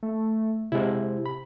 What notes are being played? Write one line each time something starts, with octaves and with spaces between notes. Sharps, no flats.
A3
C3 G#3 E4
B5